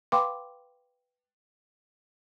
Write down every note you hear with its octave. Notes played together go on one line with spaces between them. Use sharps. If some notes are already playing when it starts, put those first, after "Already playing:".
B4 F5 G5 B5 C6 D6